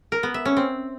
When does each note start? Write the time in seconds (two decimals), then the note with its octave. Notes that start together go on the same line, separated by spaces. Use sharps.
0.12 A#4
0.23 B3
0.34 E5
0.45 C#4
0.57 C4